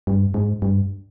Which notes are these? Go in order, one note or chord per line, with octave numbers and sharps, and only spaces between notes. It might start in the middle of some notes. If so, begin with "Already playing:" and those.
G2
G#2
G2